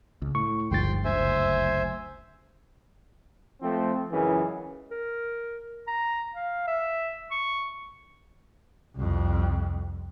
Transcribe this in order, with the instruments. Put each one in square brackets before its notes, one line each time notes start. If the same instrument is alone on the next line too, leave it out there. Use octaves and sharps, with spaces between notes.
[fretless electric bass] C#2
[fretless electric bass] A2 [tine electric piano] C#6
[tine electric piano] G1 A6 [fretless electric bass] D2 G#2 F3 [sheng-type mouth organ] G5 C6
[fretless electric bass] F#1 D2 [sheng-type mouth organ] C5 E5 G#5
[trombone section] F3 A3 C4
C#2 F#2 C#3 E3
[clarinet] A#4
A#5
F5
E5
C#6
[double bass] C2 F2